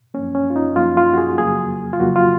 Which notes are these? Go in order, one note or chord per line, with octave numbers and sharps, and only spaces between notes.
F#2 F3 A#3 C#4
C#4
F4
D#4
F#2 F3 A#3 F4
F4
F#4
G#4
F2 C#3 F#3 A#3 G#4
F4
F2 C#3 F#3 A#3 F#4
F4